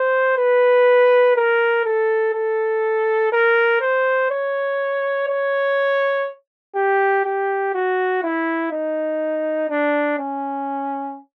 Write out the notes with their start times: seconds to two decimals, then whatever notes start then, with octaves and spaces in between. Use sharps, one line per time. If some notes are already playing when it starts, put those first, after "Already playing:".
Already playing: C5
0.37 B4
1.36 A#4
1.85 A4
2.34 A4
3.32 A#4
3.81 C5
4.31 C#5
5.28 C#5
6.75 G4
7.25 G4
7.74 F#4
8.23 E4
8.72 D#4
9.70 D4
10.18 C#4